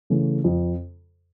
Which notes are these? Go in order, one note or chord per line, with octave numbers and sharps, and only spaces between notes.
C#3 E3 A3 C#4
F2